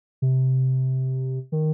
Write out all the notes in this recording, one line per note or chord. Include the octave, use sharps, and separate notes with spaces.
C3
D#3